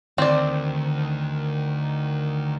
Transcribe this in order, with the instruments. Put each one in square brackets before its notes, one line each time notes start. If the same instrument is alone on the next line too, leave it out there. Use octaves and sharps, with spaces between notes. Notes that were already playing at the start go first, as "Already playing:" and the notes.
[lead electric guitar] D2 [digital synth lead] D#3 [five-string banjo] C4 D5